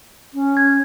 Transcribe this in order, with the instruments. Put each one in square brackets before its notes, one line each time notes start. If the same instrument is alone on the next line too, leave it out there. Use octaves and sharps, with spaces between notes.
[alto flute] C#4
[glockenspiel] G#6